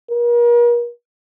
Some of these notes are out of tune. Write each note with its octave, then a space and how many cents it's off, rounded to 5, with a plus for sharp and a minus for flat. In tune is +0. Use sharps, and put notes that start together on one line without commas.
A#4 +40